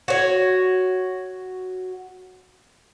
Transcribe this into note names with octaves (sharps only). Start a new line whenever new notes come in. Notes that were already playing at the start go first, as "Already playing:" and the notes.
F#4 C#5